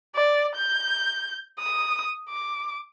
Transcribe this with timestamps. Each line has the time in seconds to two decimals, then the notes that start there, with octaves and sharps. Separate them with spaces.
0.15 D5
0.56 G6
1.60 D#6
2.29 D6